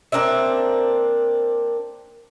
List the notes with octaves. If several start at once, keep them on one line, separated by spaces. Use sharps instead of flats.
A#3 C4 D4 E5